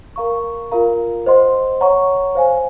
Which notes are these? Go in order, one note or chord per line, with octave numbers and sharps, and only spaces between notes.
A#4 F5 A#5 C#6
F4 A#4 F5 A#5
C5 D#5 F#5 C6
C#5 F#5 A#5 C#6
C5 F5 G#5